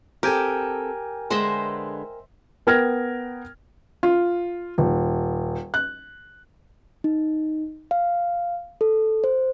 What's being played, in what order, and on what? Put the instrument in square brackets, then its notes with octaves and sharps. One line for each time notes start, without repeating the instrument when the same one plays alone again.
[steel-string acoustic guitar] C4 A4 [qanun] G4 [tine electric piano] A#4 G5 G#5
[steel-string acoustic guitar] D3 G#3 B3 [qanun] C5 D#5 E5
[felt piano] B3 A#4 G5 F6 G#6 A#6
F4
D#1
F#6
[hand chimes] D#4
F5
A4
C5